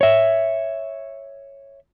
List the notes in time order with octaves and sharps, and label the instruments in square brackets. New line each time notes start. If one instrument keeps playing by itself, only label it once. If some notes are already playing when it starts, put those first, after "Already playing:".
[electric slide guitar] C#5 E5